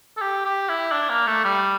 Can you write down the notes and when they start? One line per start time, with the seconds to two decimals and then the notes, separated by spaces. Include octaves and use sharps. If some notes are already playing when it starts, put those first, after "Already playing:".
0.17 A4
0.21 G4
0.45 G4
0.69 E4
0.92 D4
1.09 A#3
1.27 A3
1.45 G3